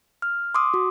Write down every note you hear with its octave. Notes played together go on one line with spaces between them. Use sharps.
F6
C6 D6 D#6
F#4